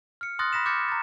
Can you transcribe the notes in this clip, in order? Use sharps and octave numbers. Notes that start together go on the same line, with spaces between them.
F6 C#7
C6 D#6 F6 F#6 A6 A#6
B5 A#6 B6 E7
D6 F6 G6 A6 C#7
A#5 A6